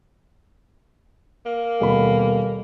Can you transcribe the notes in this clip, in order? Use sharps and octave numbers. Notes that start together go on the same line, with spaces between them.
A#3
D#1 B2 B5